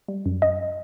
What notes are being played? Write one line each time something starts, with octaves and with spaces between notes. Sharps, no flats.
G3
F#2
F#2 D#5